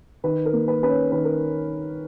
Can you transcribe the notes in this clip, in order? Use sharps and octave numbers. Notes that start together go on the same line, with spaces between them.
D#3 B4
A#4
A#3
B4
C#4 B4
C#5
D#3 B4
A#4